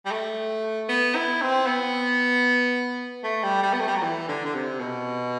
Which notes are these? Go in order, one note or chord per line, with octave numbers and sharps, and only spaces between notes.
G3
A3
B3
E4
C4
B3
A3
G3
G3
B3
A3
G3
F#3
E3
D3
D3
C3
B2